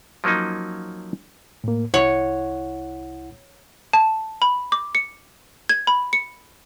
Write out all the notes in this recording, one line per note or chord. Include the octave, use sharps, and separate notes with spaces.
F3 F#3 A#3 C#4 D#4
A2 A#3
C2 E4 C#5 F#5
A5
B5
D6
C#7
G#6
B5
C#7